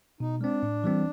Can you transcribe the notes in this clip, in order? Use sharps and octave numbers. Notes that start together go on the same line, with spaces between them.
B2 D#4
G#3 C4 D4
A2
E3 G3 C4